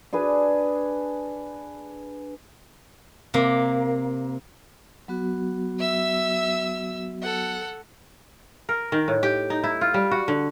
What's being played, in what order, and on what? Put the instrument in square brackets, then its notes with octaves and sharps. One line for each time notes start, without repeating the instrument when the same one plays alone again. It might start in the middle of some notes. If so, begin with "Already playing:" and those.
[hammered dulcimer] D4 G#4 B4
[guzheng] C3 A#3
[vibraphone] F#3 B3 F#4
[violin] E5 E6
A4 F#5
[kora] A#4
D#3
A2
G4
D#4
E4
F4
G3
F#4
D3